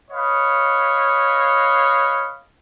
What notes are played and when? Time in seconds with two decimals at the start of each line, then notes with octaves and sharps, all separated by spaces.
0.11 B4 C#5 D#5 F5